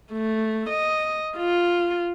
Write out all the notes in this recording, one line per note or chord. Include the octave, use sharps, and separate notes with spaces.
A3
D#5
F4